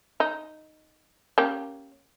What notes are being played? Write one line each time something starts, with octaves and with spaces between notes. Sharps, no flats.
D#4
A#3 C#4 G4